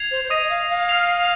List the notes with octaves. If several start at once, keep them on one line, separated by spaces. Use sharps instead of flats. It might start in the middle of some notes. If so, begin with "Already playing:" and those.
Already playing: G#6 C7 F7
C5
C5
D#5 D#6 A#6 D#7
D#5
F5
F5
F6 C7 F7